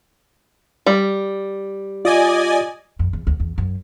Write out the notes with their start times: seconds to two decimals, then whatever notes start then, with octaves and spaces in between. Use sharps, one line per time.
0.86 G3
2.05 F4 D5 D#5 G#5
2.99 F2
3.13 E2
3.27 D2
3.40 E2
3.58 F#2